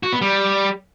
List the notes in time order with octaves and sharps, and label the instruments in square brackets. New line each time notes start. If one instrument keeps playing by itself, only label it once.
[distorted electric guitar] F#4
B3
G3